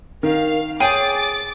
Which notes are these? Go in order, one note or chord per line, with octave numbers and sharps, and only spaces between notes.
D#3 A#4 F5
G#4 C#5 G5 D6 A6